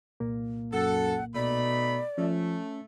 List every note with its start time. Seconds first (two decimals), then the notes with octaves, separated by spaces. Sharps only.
0.20 C2 A#2 A#3
0.73 F#2 A4 F#5
1.35 B2 A3 D#4 D5 B5
2.18 F3 A3 C#4